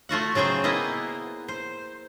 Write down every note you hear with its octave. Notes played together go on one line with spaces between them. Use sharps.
A3 F4 F#4 F#5
C#3 F#3 G#4 C5 G5
A#3 B3 E4 D#5
C5